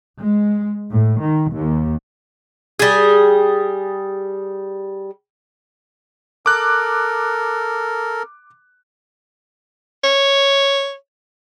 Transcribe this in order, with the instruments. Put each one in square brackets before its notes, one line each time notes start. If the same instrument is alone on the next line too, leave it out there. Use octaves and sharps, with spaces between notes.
[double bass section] G#3
A2
D#3
D#2
[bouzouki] G3 G#4
[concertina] A4 A#4 [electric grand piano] D6 F#6
[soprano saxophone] C#5